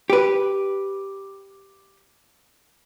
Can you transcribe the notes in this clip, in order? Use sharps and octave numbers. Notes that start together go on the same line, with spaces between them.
G4 B4